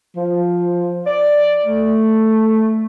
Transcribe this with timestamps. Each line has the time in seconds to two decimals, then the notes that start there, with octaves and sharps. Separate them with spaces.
0.16 F3
1.06 D5
1.65 A3